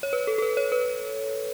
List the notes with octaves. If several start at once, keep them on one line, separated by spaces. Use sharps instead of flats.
C#5
B4
A4
A4
B4
C#5
B4